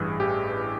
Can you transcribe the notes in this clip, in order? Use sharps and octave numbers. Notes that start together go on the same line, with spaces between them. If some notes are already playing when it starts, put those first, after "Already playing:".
Already playing: A1 G2 E3 G#4
A1 G4